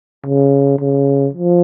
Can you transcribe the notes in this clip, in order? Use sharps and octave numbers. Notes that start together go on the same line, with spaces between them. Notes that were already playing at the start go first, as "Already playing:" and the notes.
C#3
C#3
F3